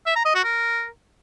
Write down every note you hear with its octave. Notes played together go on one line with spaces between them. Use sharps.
E5
A#5
D#5
F#4
A#4